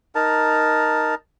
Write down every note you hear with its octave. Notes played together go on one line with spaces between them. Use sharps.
D#4 A#4 A5